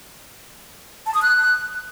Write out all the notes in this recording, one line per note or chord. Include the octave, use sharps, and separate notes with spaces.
A5
D#6
F#6